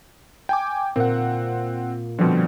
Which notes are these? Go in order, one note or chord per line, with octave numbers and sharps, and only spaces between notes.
G5 G#5 D6
A#2 C4 F#5
B2 D3 F3 G3 C4